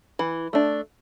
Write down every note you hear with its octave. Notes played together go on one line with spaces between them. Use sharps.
E3
A3 D4